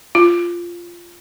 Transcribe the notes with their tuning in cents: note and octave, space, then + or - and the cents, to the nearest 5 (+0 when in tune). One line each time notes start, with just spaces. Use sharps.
F4 -10